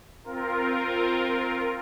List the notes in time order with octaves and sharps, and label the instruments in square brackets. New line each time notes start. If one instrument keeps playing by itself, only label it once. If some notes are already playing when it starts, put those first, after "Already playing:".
[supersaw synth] C4 F4 A#4